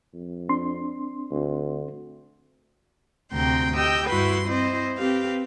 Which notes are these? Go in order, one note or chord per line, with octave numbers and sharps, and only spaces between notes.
F2
C4 D4 C6
D2
D2 C3 C4 G5 A#5 C6
G4 D#5 G5 E6 G6
G2 E4 F#4 B4 B5 C6
C4 E4 C5 D#5
C4 G4 B4 F5